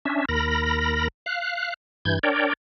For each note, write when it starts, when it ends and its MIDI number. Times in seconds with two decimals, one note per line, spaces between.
0.05 0.25 61
0.05 0.25 62
0.05 0.25 76
0.29 1.08 39
0.29 1.08 70
0.29 1.08 83
0.29 1.08 94
1.26 1.74 77
1.26 1.74 90
2.05 2.19 43
2.05 2.19 52
2.05 2.19 91
2.05 2.19 92
2.23 2.53 62
2.23 2.53 70
2.23 2.53 73
2.23 2.53 74
2.23 2.53 79